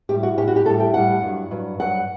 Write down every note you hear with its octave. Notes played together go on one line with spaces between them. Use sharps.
A2 G3 G4
F#4
A2 G3 G4
F#4
G4
A2 G3 A4
G5
A2 G3 F#5
G2 F#3
G2 F#3
G2 F#3 F#5